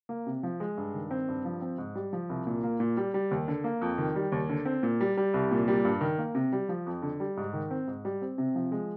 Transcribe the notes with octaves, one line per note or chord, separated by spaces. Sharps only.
A#3
C3
F3
G#3
G2
D#3
C4
G2
F3
C4
G#2
G3
F3
C2
A#2
A#3
A#2
G3
G3
D#2
D3
A#3
F2
D#3
G3
D#2
D3
C4
A#2
G3
G3
C2
A#2
G3
G2
D#3
A#3
C3
G3
F3
F2
D3
G3
G#2
D#3
C4
G#2
G3
C4
C3
F3
G#3